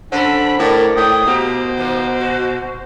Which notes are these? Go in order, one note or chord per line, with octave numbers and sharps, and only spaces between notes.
D3 C#4 A4 C5 B5
A2 A#4 D5
A2 G5 D#6
B2 A#3 G4 C5
D#3 F3 A#3
F#4